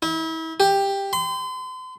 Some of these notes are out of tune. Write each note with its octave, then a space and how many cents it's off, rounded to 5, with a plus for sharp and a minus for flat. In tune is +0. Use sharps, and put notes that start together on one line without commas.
E4 -35
G4 +10
C6 -40